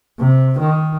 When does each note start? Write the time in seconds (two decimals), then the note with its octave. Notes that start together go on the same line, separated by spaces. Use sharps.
0.19 C3
0.59 D#3